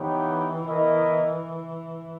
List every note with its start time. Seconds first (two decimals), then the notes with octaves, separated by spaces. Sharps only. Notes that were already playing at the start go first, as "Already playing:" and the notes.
Already playing: E3 B3 D#4 G4 C#5 G5
0.63 B3 E4 A#4 D#5